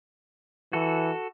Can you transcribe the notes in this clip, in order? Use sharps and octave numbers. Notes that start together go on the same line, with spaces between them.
E3 F#4 A4